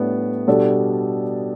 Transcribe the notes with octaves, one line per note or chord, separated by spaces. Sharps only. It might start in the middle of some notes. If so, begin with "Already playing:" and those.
Already playing: A2 G3 B3 D4
B2 G3 D4 A4